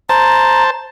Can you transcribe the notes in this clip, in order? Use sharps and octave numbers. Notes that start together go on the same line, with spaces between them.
C5 A5 A#5